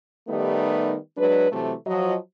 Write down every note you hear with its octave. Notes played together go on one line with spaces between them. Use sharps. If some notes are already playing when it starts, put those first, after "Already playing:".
D#3 G3 A3 B3 D#4 G4
F#3 G#3 D4 B4
C3 E3 F#3 A3
F3 F#3 D#5